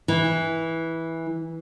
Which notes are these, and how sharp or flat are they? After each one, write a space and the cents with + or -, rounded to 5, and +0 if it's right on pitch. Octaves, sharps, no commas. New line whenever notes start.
E3 -10